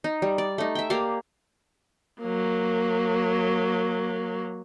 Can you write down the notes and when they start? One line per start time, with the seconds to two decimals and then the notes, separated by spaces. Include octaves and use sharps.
0.04 D#4
0.22 G3
0.38 D5
0.58 A3 D#4
0.75 E5 G5
0.90 A#3 G4 D5 F5
2.21 F#3 A#3